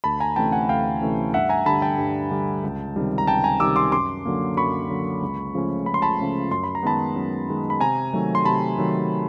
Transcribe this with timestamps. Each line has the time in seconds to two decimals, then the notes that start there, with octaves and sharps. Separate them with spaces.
0.04 D2 A5 B5
0.20 G#5 A#5
0.36 C3 E3 A3 C#4 G5 A5
0.52 F#5 G#5
0.69 D2 F5 G5
1.02 C3 E3 A3 C#4
1.34 G2 E5 F#5
1.49 G#5 A#5
1.66 D3 G3 A5 B5
1.82 G5 A5
1.98 G2
2.31 D3 G3
2.63 C#2
2.96 C3 D#3 G3
3.18 A#5
3.27 C#2 G5 A5
3.44 G#5 A#5
3.60 C3 D#3 G3 D6 E6
3.76 C6 D6
3.92 F#2 C6 D6
4.25 D3 F#3 A#3
4.57 F#2 B5 C#6
4.89 D3 F#3 A#3
5.22 C#2
5.55 C#3 F3 A3 C#4
5.86 C#2 B5
5.94 C6
6.02 A5 B5
6.19 C#3 F3 A3 C#4
6.51 F#2 C6
6.64 B5
6.75 A#5
6.83 D#3 G#3 B3 A5 B5
7.16 F#2
7.49 D#3 G#3 B3
7.70 B5
7.80 C3 G#5 A#5
8.13 D#3 F#3 A3
8.35 C6
8.45 C3 A5 B5
8.78 D#3 F#3 A3